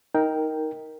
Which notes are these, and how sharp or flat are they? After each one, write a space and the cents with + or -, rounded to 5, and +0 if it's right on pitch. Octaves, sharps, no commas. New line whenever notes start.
D#4 +15 A#4 +0 G5 +0